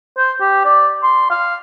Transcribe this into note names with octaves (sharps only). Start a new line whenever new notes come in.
C5
G4
D5
C6
F5